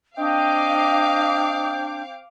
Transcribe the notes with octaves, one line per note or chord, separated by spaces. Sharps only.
C4 D4 D#5 F5 G5 D6